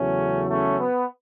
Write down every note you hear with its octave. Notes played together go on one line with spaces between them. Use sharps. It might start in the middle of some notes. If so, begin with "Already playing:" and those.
Already playing: E2 C#3 F#3 A3 C#4
A3 C#4
B3